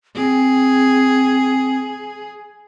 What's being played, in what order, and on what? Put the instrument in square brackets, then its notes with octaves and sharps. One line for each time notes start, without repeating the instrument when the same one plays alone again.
[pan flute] C4 [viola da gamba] G#4